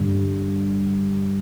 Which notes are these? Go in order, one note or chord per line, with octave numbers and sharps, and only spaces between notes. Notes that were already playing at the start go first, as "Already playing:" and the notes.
Already playing: G2 D3 G3